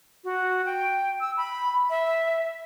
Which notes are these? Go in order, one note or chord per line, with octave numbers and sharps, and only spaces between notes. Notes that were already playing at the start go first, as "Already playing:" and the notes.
F#4
G5
E6
B5
E5